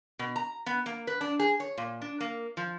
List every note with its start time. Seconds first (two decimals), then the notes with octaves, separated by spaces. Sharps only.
0.19 B2
0.36 A#5
0.66 B3
0.86 A#3
1.07 B4
1.21 D4
1.39 G#4
1.60 C#5
1.78 A#2
2.02 D4
2.20 A#3
2.57 F3